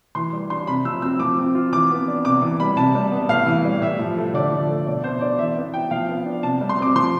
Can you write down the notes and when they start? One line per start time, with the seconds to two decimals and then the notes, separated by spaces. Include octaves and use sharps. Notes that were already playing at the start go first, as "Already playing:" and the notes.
0.15 E3 C6
0.33 G3
0.50 D4 C6
0.67 C3 B5
0.85 F3 E6
1.02 C4 E6
1.20 F3 D6
1.38 C4
1.55 F4
1.72 E3 D6
1.91 B3
2.08 D4
2.24 C3 D6
2.42 E3
2.60 G3 B5
2.77 C3 A5
2.95 G3
3.11 B3
3.29 A2 F5
3.46 E3
3.65 G3
3.81 A2 E5
3.99 F3
4.17 A3
4.34 D3 D5
4.52 F3
4.69 A3
4.86 B2 D5
5.04 B3 C5
5.21 D4 D5
5.38 E3 E5
5.57 B3
5.73 E4 G5
5.91 F3 F5
6.09 B3
6.26 D4
6.43 C3 A5
6.61 G3
6.69 C6
6.78 C4 D6
6.96 F3 C6